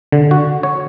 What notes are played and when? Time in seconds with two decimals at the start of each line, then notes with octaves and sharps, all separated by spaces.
0.12 D3
0.31 F#4
0.63 C#5